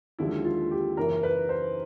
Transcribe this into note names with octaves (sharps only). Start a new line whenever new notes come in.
D#2 D3 F3 G#3 E4
F4
G4
F#2 C#3 E3 A#4
B4
C5